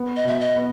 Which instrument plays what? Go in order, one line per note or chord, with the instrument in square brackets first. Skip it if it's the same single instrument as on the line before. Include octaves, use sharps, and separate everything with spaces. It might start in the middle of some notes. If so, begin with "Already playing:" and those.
Already playing: [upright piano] B3
[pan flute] D#5
[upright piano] B2 [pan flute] E5
[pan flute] D#5
[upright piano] B3